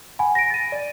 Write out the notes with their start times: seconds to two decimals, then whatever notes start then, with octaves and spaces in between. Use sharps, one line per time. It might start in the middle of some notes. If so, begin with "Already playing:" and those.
0.19 F#5 G#5 B5
0.35 A#6 D7
0.50 A6 D#7
0.72 D5